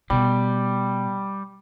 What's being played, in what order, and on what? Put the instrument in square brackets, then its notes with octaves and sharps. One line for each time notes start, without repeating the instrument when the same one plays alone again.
[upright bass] B2 [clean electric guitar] G3